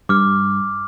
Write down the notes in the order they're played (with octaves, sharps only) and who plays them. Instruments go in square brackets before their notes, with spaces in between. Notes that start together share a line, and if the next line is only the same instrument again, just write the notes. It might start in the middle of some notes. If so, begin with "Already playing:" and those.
[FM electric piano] G2 [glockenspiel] D6 F6